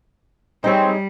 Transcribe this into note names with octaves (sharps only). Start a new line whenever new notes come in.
G3 C4 D#4 G#4 C#5